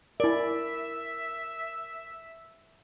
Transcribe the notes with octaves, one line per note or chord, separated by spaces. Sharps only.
E4 A#4 D5 E5